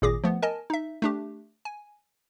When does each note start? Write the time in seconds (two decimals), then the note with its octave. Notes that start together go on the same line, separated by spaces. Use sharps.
0.02 G#1 A#2 G#4 D6 D#6 A#6
0.24 F3 A3 B3
0.42 A#4 D#5 G#5 A5
0.70 D#4 E5
1.02 A3 D4 G4
1.65 G#5